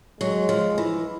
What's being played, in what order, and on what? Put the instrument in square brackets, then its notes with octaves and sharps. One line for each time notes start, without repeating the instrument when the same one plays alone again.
[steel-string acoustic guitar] F#3 [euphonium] G#3
[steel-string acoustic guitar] F3
E3